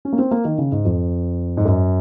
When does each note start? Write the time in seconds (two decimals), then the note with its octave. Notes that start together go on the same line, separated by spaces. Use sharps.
0.05 C#4
0.13 A#3
0.19 C4
0.31 A#3
0.45 D#3
0.58 C#3
0.72 G#2
0.85 F2
1.57 G#2
1.65 F#2